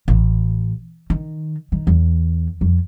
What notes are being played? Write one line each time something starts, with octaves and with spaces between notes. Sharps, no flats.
A1
D#3
D#3
E2
F2